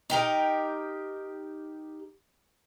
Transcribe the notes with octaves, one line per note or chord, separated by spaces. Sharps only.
D#4 G4 A#4